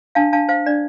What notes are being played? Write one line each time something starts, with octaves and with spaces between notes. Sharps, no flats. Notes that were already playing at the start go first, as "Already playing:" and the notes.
D4 F5 A5
D4 F5 A5
C5 F5
D4 D5